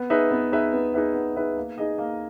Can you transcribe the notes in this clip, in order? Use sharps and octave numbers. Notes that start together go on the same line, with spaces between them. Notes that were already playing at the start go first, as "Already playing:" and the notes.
Already playing: B3
D#4 G#4 B4 E5
B3
D#4 G#4 B4 E5
B3
D#4 G#4 B4 E5
B3
D#4 G#4 B4 E5
A#3
D#4 G#4 D#5
A#3